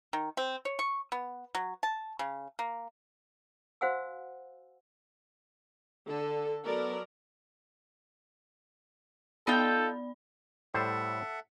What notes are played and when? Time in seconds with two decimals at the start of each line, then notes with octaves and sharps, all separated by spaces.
0.13 D#3
0.37 C4
0.65 C#5
0.79 C#6
1.12 B3
1.55 F#3
1.83 A5
2.19 C#3
2.59 A#3
3.81 F#4 C5 F5 F#5 G#5 E6
6.06 D3 A4
6.65 F#3 B3 A4 A#4 D5
9.47 B3 D#4 F4 A4 D5 G5 B5
10.74 A2 G3 A4 C5 E5 F#5